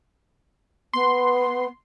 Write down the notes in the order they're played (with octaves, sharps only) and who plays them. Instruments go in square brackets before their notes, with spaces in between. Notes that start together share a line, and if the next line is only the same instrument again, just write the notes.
[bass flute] B3 [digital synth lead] C6